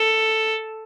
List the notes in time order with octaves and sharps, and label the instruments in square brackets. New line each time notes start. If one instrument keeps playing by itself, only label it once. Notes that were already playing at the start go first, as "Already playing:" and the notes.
Already playing: [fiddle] A4